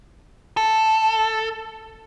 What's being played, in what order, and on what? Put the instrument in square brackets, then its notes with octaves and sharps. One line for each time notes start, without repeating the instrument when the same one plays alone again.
[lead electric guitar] A4